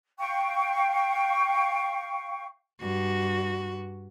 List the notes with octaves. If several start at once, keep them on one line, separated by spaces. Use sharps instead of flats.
F5 G5 C#6
G2 F#4